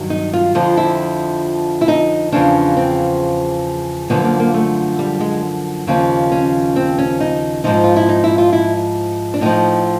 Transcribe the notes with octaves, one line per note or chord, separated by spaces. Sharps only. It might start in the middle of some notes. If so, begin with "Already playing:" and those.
Already playing: G2 D#3 F#3
D#4
F4
F2 D3 F3 F4
E4
E4
D#4
E2 C#3 F3 D4
C4
F#2 D3 F3 B3
A#3
A#3
A3
G3
G#3
D#2 C#3 F3
C#4
C4
C#4
D#4
G#2 F3 D#4
F4
E4
D#4
E4
F4
E4
D4
A2 F3 D#4